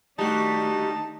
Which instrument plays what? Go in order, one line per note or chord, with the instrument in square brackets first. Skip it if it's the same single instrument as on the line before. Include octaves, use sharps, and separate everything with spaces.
[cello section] D#3 A3 D4 [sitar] G3 F#4 [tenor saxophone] D#4 [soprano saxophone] A5